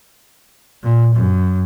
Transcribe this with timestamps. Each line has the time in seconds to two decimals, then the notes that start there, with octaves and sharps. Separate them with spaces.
0.83 A#2
1.15 F#2